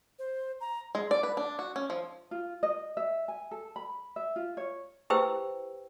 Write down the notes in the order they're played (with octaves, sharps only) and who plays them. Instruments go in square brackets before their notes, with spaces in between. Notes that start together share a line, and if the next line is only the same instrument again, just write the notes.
[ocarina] C5
A#5
[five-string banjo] G#3
D5
B4
D4
F#4
C#4
F3
[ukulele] F4
D#5
E5
G#5
A4
B5
E5
F4
C#5
[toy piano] E4 G4 B4 C5 G5 E6